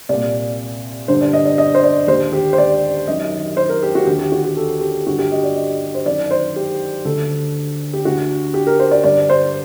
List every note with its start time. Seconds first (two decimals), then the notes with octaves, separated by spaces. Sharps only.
0.09 C2 A#2 D5
1.08 G2 D3 C5
1.21 D5
1.33 D#5
1.45 D5
1.58 D#5
1.75 C5
1.84 D5
2.08 D#2 D3 C5
2.33 G4
2.53 C5
2.58 D5
3.08 F#2 D#3 D#5
3.57 C5
3.69 A#4
3.83 G4
3.95 F#4
4.07 D#2 D3 G4
4.19 G4
4.32 F#4
4.44 G4
4.57 A4
4.81 G4
5.07 G2 D3 F#4
5.19 G4
5.32 D#5
5.43 D5
5.56 D#5
5.95 C5
6.05 F#2 D#3 D5
6.31 C5
6.56 G4
7.05 D2 D3 A4
7.93 G4
8.05 D2 D3 F#4
8.54 G4
8.67 A#4
8.80 C5
8.91 D5
9.04 G2 D3 D5
9.30 C5